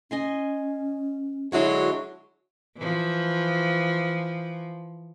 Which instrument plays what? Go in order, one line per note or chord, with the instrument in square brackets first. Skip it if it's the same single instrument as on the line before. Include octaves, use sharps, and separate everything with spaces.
[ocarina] C#4 [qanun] D#5 G#5 C6
[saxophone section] D3 F#3 G#3 [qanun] E4 F#4 C#5
[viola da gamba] E3 F3